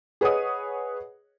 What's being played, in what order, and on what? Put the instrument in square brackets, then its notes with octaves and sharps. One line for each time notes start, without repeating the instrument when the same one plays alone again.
[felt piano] G#4 B4 C#5 D#5 F#5 D#6